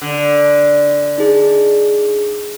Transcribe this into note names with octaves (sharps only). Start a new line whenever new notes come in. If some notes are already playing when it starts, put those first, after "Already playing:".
D3
D#4 G#4